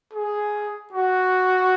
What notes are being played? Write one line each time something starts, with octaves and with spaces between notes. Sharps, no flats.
G#4
F#4